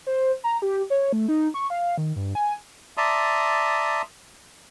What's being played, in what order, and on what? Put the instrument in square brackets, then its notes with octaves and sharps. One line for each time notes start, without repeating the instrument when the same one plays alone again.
[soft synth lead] C5
A#5
G4
C#5
A3
D#4
C#6
F5
D#3
G2
G#5
[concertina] D5 E5 A5 A#5 C6 D#6